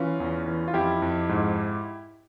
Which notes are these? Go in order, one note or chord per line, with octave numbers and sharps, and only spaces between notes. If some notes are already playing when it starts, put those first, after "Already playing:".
Already playing: E3 C#4 F4
E2
E3
F4
F2 E4 G4
F2
G#2